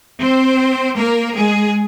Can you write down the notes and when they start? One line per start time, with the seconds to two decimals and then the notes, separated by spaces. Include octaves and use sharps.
0.22 C4 C5
0.97 A#3 A#4
1.36 G#3 G#4